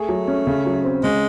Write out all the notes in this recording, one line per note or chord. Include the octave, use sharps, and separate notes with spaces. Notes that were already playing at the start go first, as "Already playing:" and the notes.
Already playing: A3 G#4
F#3
C#4
C#3
F#3
C4
C#3 G#3